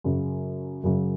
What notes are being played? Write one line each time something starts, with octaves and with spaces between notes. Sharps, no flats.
F#2 C#3 F#3
F#2 C#3 F#3